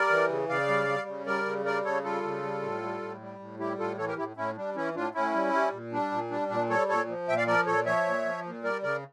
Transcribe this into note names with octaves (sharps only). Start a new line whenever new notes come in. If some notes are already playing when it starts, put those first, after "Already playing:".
Already playing: G3 A#4 D5
E3
C#3
C#3 D5 F5
G3
G3
C#3
G3 A#4 D5
C#3
G3 A#4 D5
C#3 A4 C#5
G3 F4 A4
C#3
G3
A2
G3
A2
G3
A2
G3 E4 G4
A2 F4 A4
E3 A4 C#5
G4 A#4
A2 E4 G4
A2 C#4 E4
G3 D4
E3 C#4 E4
A2 D4 F4
A2 C#4 E4
G3
G3
A#2
G3 D4
A#2
G3 D4
A#2 D4
G3 A4 C#5
A#2 A4 C#5
F3
A#2 E5 G5
D5 F5
F3 A#4 D5
A#2 A4 C#5
F3 C#5 E5
A#2
F3
A#2
G3 A#4 D5
C#3 A#4 D5